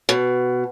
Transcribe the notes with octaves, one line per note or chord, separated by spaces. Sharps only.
B2